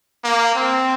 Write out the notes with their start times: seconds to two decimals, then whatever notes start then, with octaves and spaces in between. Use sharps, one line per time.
0.24 A#3
0.55 C4